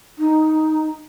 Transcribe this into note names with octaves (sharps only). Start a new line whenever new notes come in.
D#4